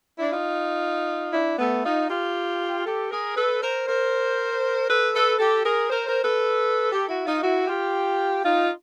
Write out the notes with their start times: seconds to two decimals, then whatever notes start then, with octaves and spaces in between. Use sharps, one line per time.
0.19 D4 E4
0.32 D#4 F4
1.33 D4 E4
1.59 A3 B3
1.84 D#4 F4
2.09 F4 G4
2.85 G4 A4
3.11 G#4 A#4
3.36 A4 B4
3.62 A#4 C5
3.87 A#4 C5
4.88 A4 B4
5.14 A4 B4
5.39 G4 A4
5.64 G#4 A#4
5.89 A#4 C5
6.07 A#4 C5
6.23 A4 B4
6.91 G4 A4
7.08 E4 F#4
7.25 D#4 F4
7.42 E4 F#4
7.67 F4 G4
8.44 D#4 F4